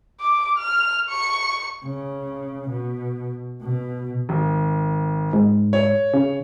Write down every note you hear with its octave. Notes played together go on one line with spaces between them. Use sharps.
D6
F6
C#6
C#3
B2
B2
G#1
G#2
C#5
C#3